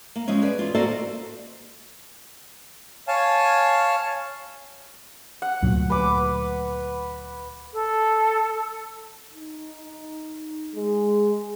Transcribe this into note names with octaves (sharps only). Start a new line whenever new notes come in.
A#3
F3 G#3 C4 C#4
G#4 B4 D5
E2 F4
A#3 F#4 A4 C5 D5 D#5
C#5 F5 G#5 A5
F#5
D2 A#2 F#3
B4 D6
A4
D#4
G#3